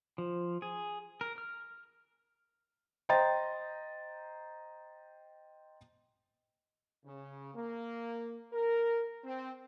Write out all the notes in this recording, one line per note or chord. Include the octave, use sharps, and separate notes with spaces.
F3
G#4
A#4
F6
C5 D#5 G5 A#5 C6 A6
C#3
A#3
A#4
C4